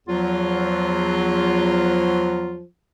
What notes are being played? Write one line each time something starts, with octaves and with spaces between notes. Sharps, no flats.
E2 F3 F#3 F4